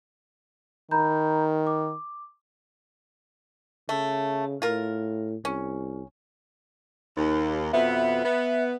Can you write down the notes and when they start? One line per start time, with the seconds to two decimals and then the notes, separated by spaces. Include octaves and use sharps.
0.91 D#3 A#5 B5 G6
1.67 D6
3.89 C#3 A3
4.62 A2 F4 A#4
5.45 C2 C#4
7.17 D#2
7.73 F2 B2 B3 E5
8.24 B3